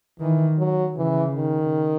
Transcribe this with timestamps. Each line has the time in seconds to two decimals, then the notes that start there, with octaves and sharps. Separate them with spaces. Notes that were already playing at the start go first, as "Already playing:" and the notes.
0.20 D#3 E3
0.58 F#3
0.97 C#3 E3
1.36 D#3